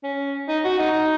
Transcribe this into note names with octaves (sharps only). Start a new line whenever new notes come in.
C#4
D#4
F#4
D#4